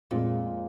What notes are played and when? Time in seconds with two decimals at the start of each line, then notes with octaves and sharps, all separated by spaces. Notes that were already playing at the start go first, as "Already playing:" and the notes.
0.11 F2 A#2 F3 G#3